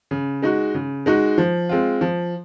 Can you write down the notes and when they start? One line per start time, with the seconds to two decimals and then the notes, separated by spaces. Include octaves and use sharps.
0.11 C#3
0.42 G#3 D#4 F#4
0.75 C#3
1.06 G#3 D#4 F#4
1.38 F3
1.69 G#3 C4 F4
2.01 F3